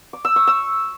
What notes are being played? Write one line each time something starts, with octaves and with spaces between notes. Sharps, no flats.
D6
E6
C#6
E6